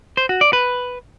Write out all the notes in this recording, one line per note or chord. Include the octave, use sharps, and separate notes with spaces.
C5
F#4
D5
B4